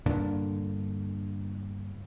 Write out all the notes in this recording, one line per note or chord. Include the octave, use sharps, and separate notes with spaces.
G2 A#2 D3